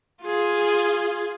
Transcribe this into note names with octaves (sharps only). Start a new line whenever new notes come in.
F4 G#4